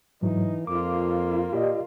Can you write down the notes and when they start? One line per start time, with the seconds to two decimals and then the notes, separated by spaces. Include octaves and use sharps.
0.22 G#2 E3 F#3 D#4
0.67 F2 A#3 F4 D6
1.53 A#2 G4 D5 D#5